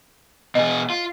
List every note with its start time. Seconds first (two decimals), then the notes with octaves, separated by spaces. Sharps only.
0.55 B2 G#4 D#5
0.90 F4